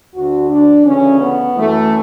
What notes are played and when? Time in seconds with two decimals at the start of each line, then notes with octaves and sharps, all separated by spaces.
0.14 D2 D3 F#4
0.49 D4
0.85 D2 C#3 E3 C#4
1.20 B3
1.55 F#2 E3 A3